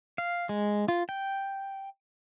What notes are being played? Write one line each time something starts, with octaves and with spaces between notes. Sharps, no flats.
F5
G#3
F4
G5